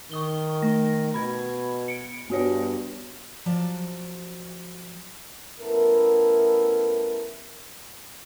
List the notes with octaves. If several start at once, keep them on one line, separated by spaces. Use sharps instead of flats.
D#3 C#6 D#6 G7
A3 A#6
B2 B5 G#6
C#7 D7
G2 B3 F#4 C#5
F3 F#3 D5 A5
A3 B3 C#4 E4 A4 A#4